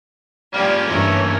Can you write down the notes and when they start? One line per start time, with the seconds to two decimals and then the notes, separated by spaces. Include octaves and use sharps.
0.54 G#2 F3 G3 A#3 C#4
0.88 G2 E3 A3 A#4 C#5